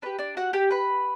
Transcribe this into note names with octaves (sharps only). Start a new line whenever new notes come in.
D4 G4 B4
D4 D5
F#4 F#5
G4 G5
B4 B5